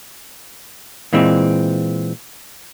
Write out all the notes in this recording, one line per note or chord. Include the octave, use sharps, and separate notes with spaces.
A#2 E3 G#3 C4